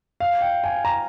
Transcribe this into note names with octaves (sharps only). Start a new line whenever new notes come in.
F5
G5
G#5
A#5